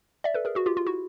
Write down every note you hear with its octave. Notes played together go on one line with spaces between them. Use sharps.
D5 E5
A4 B4
G#4 A#4
F#4 G#4
F4 G4
F4
E4 F#4